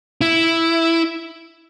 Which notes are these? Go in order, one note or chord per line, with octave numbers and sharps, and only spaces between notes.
E4